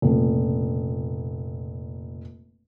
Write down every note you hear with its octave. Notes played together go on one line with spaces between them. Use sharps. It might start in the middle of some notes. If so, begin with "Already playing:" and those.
F1 A#2 C#3